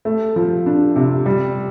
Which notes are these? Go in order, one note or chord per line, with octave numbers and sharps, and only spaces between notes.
A3
F3
D4
C3
G3